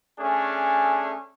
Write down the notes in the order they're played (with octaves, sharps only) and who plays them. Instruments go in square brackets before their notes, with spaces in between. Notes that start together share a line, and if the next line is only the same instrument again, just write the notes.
[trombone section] A3 C#4 D4 G#4